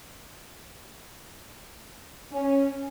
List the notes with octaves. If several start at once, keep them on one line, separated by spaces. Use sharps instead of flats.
C#4